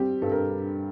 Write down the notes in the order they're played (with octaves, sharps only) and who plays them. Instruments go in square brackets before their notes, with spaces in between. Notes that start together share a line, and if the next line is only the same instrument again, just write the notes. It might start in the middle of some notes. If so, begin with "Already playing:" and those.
Already playing: [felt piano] G3 C4 G4
G2 A4
A#4